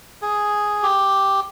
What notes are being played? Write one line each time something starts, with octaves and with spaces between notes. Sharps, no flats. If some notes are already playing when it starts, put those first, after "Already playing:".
G#4
G4